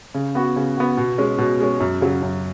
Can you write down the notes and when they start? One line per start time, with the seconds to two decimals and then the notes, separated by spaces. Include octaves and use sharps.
0.15 C#3
0.35 B3 F#4
0.56 C#3
0.77 B3 F#4
0.97 B2
1.18 G#3 C#4
1.38 B2
1.60 G#3 C#4
1.80 F#2
2.01 C#3 F#3
2.23 F#2